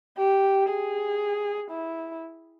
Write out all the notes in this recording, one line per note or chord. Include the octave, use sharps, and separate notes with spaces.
G4
G#4
E4